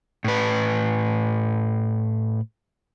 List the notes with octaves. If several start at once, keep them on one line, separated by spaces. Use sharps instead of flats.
A2 B4